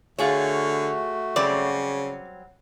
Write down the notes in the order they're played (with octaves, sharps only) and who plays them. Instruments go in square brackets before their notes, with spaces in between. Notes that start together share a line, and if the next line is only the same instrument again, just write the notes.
[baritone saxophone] D3 [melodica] A3 F#4 [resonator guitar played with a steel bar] F4 G#4 C#5
[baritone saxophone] C#3 [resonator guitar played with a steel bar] F#3 G3 C4 [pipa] D5